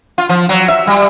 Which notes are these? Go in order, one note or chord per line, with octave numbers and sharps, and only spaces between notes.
F4
F3
F#3
E5
G3